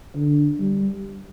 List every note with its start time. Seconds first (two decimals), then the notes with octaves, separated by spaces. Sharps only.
0.15 D3
0.59 G3